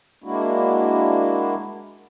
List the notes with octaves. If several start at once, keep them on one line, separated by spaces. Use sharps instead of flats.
G#3 A#3 D4 E4 F#4